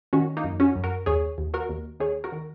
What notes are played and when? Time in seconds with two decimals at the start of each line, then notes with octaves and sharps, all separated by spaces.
0.13 D#3 C#4 F#4
0.37 A#3 D#4
0.44 F#2
0.60 C#4 F#4
0.76 F#2
0.84 F#4 A#4
1.06 D#2 G#4 C#5
1.38 D#2
1.54 F#4 A#4
1.69 D#2
2.00 D#2 G#4 C#5
2.24 F#4 A#4
2.32 D#3